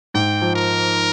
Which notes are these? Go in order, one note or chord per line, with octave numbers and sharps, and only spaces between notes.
G#2 G5
F3
A#4